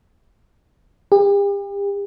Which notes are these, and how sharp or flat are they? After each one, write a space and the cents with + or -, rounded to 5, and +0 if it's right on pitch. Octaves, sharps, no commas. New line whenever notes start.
G4 +40